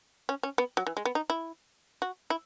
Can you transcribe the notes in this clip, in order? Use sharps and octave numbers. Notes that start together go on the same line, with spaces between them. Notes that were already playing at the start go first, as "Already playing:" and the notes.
C#4
C#4
B3
F#3
E3
G#3
B3
D#4
E4
F#4
E4